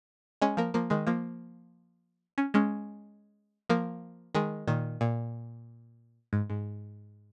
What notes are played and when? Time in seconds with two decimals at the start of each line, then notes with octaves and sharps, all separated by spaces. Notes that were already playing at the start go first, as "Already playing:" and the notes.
0.41 G#3 C#4
0.57 F3 A#3
0.74 F3 A#3
0.90 D#3 G#3
1.07 F3 A#3
2.38 C#4
2.54 G#3 C#4
3.69 F3 A#3
4.35 D#3 G#3
4.67 A#2 D#3
5.01 A#2
6.33 G#2
6.50 G#2